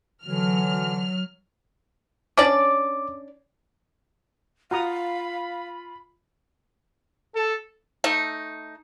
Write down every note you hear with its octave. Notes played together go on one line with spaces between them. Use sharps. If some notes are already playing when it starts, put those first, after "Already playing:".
D3 E3 F#3 F6
C#4 D4 D5 D6
F4 F5 F#5 A#5 B5 D#6
A4
A3 D#4